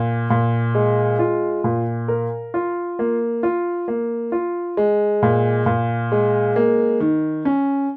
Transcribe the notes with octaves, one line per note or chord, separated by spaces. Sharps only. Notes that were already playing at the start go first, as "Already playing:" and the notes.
Already playing: A#2
A#2
G#3
F4
A#2
A#4
F4
A#3
F4
A#3
F4
G#3
A#2
A#2
G#3
A#3
D#3
C#4